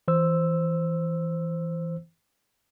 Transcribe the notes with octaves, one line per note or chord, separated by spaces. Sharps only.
E3 C5 E6